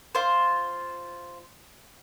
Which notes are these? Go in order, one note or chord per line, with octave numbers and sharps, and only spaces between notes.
F4 C5